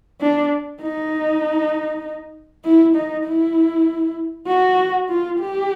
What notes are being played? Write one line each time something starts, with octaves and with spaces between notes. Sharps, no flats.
D4
D#4
E4
D#4
E4
F#4
F4
G4